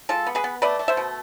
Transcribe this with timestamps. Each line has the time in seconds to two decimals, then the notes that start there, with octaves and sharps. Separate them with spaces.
0.09 G#3 F4 A4
0.27 B3
0.35 G#4 B4
0.44 B3
0.62 A3 B4 D5
0.79 A3
0.88 C5 E5
0.97 B2